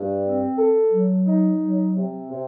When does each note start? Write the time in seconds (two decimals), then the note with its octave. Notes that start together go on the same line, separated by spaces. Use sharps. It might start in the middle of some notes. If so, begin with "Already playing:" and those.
Already playing: G2
0.22 C4
0.57 A4
0.91 F#3
1.26 D#4
1.61 F#3
1.95 C3
2.30 C3